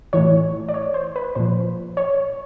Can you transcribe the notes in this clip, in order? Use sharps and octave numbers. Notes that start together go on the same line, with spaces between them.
A2 E3 C#5
D5
C#5
C5
B4
A#2 F3 C5
C#5